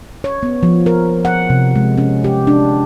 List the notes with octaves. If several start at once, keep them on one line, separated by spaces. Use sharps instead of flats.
C#5
B3
F3
A#4
F#5
C3
G#3
C#4
G4
D4